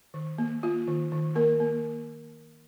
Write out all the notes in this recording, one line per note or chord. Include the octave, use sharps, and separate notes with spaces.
D#3
A#3
A#3 F4
D#3
D#3
A#3 A#4
A#3